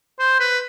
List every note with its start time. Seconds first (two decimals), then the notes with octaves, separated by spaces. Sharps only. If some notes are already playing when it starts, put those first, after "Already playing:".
0.19 C5
0.40 B4